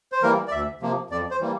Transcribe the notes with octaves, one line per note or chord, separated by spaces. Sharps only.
C5
E3 G3 A#3 A#4
D5
D2 E5
C3 F3 A#3
F2 D5
C5
E3 G3 A#3